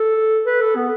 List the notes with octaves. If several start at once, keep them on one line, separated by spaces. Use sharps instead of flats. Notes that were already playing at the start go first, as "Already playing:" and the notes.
Already playing: A4
B4
A4
B3